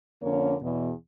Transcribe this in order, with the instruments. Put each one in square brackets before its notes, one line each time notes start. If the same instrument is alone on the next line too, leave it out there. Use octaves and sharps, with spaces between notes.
[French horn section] F2 D3 A#3 C#4 A#4 C#5
E2 B2